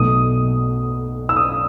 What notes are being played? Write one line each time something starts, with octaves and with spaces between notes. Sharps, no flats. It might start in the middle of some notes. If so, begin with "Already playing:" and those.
Already playing: B1 B2 A3 D#6
E6
D#6